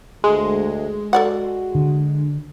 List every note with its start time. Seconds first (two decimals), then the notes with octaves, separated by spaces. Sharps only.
0.24 D2 G#3
1.13 F#4 A4 D5 F#5
1.75 D3